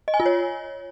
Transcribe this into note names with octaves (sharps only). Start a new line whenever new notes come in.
D#5
G#5
F4
C#5